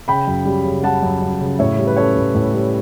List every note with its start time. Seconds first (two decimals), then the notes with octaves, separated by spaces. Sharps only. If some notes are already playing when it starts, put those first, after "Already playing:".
0.08 C#3 G5 B5
0.27 F#2
0.45 G3
0.65 C#3
0.83 G3 F#5 A5
1.03 F#2
1.22 F#2
1.41 C#3
1.59 A2 C#5 E5
1.78 G3
1.87 B4
1.97 C#4 A4 C#5
2.16 A2
2.34 A2
2.54 G3